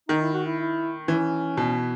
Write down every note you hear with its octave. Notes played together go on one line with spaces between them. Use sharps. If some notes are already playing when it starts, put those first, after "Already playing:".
D#3 D#4
E4
F#4
E4
E4
E3 C#4
B2